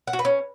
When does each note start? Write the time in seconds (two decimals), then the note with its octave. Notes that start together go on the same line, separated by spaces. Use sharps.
0.07 F#5
0.13 F#4
0.19 B4
0.25 C#4